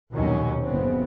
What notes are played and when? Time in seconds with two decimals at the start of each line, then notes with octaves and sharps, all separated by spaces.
0.12 A#1 D#2 B2 D#3 F#3 C#4
0.63 F#1 C#3 B3 C4